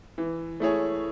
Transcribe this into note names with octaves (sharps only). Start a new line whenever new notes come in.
E3
A3 E4 G#4 C#5